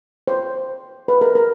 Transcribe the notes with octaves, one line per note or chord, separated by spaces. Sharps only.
C5
B4
A#4
A#4